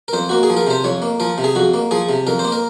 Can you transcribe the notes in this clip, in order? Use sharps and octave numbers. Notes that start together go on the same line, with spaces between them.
A#4
F2 C5
A#3 F#4
G#4
F3
A#4
C3 C5
F2 C#5
A#3
F3 A#4
C3
G#4
F2 F#4
A#3
F3 G#4
C3
F2 A#4
C5
A#3
A#4